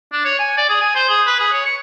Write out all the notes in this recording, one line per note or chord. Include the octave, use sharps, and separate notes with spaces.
D4
C#5
G#5
D5
G#4
G#5
C5
G#4
B4
G#4
C#5
C#6